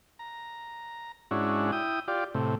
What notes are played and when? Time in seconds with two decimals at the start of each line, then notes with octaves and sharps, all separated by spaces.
0.19 A#5
1.31 G#2 C#4 D4 E4 F#4
1.72 E4 G5 D#6
2.08 F4 G4 D5
2.34 A2 C3